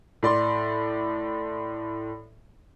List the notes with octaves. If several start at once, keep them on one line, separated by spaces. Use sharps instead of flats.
A2 D5 C6